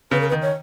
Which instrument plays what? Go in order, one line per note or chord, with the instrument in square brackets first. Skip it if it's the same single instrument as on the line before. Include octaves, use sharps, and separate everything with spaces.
[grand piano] C#3 [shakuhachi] B4
[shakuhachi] A#4
B4
[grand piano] D#3
[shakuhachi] C#5